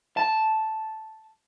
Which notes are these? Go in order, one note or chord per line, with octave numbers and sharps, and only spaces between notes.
A5